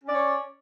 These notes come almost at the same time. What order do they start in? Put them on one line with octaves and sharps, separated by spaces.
C#4 D5 C#5